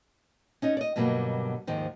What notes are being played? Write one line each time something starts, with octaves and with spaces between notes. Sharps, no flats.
C#4 D#4 D#5
D5 D#5
G2 B2 D3 F#3 G3 A#3
D#2 G#2 D#3 F3